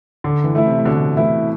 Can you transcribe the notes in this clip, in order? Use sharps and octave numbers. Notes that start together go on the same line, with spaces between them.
D3
E3
A3 E4
C3
A2
B2 D3
E3 A3 E4